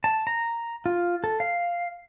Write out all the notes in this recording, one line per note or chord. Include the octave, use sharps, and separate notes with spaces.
A5
A#5
F4
A4
F5